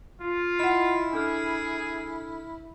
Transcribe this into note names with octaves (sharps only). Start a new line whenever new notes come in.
F4
E4 D#5 F#5
D4 G#4 A4 F6